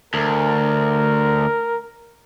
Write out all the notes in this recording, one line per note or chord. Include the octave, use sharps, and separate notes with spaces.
D2 A#4